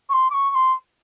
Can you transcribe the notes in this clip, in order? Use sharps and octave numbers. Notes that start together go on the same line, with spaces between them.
C#6
C6
D6
C#6
C#6
C6